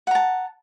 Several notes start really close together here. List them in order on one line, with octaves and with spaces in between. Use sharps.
F#5 A#5 A5